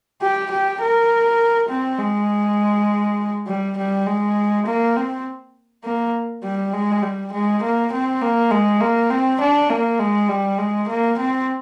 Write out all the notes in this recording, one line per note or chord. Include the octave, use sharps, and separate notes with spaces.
G4
G4
A#4
C4
G#3
G3
G3
G#3
A#3
C4
A#3
G3
G#3
G3
G#3
A#3
C4
A#3
G#3
A#3
C4
D4
A#3
G#3
G3
G#3
A#3
C4